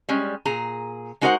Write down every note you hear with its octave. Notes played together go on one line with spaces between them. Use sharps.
G3 G#3 C#4
A#2 G#4 A#5
G#3 D#4 F#4 A#4 C5 F#5